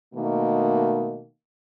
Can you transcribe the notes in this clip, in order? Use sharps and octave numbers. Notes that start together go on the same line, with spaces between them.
B2 D#3 A3 A#3